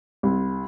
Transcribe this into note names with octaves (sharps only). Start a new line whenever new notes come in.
C2